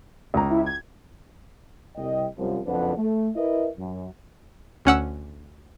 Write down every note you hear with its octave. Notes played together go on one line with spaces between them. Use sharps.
C#2 A#5
E4
G#6
C2 D#5 G5
C2 F#2 F3
F#1 F2 F3 D4 B4 F#5
A3
E4 A#4 B4 D#5 E5
F#2
D2 C#4 F#5 E6